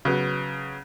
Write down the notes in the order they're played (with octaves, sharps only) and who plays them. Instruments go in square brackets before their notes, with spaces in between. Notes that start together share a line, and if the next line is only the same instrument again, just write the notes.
[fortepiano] C#3 F#3 B3